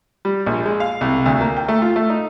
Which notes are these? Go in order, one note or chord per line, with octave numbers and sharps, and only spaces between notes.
G3
A#1
G#3
F5
C2
D2
A#3
G5
A3
F4
A3
D#4